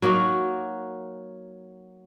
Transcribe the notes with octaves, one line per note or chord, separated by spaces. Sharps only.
F#3 A#3 D#4 F#4